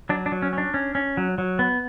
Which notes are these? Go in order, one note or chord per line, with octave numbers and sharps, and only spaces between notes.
F#3 D4
D4
F#3
C#4
C#4 D4
C#4
C#4
F#3
F#3
B3